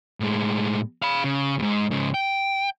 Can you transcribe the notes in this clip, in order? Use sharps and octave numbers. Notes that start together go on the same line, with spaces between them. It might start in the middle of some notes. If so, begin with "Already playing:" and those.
A2 G#3
F5 B5
C#3
E2 G#2
G#2 C#3
G5